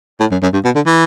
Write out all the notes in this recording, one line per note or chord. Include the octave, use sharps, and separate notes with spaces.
A2
F#2
F#2
G2
B2
D3
E3